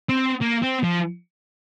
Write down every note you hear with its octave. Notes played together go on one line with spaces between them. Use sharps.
C4
A#3
C4
F3